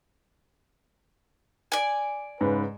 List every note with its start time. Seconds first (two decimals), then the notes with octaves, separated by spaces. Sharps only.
1.72 D5 G#5
2.41 G#2 C#3 B4